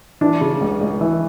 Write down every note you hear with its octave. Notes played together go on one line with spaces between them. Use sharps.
E3 D4
C#3
C#2
C#2
E3